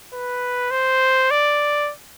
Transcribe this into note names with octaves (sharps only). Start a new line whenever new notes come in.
B4
C5
D5